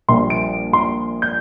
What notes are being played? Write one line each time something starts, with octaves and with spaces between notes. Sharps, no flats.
A#1 A#2 G3 C6
D7
C6
G6